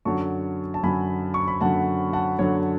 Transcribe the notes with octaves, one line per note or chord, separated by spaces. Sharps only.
F#2 D3 F#3 A5 C#6
A5
F#2 D3 F#3 G#5 B5
C#6
B5
F#2 D3 F#3 F#5 A5
F#5 A5
F#2 D3 F#3 C#5